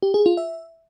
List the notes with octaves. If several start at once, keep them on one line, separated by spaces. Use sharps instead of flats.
G4
G#4
F4
E5